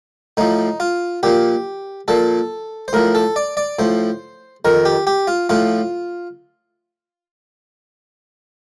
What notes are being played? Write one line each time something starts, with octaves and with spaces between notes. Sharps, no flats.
A2 F3 D#4
F4
A#2 F3 G4
A#2 F3 A4
C5
A2 F3 A#4
A4
D5
D5
A2 F3 C5
F2 D#3 A#4
G4
G4
F4
A2 F3 F4